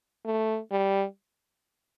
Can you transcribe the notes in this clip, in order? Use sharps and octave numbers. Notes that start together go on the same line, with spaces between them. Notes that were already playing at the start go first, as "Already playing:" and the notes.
A3
G3